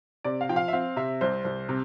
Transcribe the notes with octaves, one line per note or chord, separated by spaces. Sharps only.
C3 D5
F5
F3 G5
F5
E5
C4 F5
C3 E5
C2 C5
C2
C3